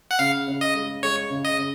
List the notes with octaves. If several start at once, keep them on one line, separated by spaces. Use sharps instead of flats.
F#5
C#3 F5
C#3
D#5
G#3
G#3 C#5
C#3
D#5
C#3